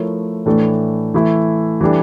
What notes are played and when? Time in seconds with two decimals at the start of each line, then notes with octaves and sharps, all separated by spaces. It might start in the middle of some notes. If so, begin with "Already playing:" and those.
Already playing: F3 A3 E4 A#4 C#5
0.46 A2 E3 A3 D4 A4
1.14 E3 A3 E4
1.81 E3 G3 D4 A4